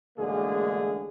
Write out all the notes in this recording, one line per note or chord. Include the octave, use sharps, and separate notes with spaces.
A1 D2 D3 G#3 A#3 G#4